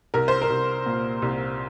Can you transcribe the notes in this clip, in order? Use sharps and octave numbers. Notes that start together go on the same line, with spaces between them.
C2 A#4
C5
A#4
C2
A#2
C2